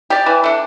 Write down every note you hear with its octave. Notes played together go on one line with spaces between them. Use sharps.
G4 D5
E3
A3 D4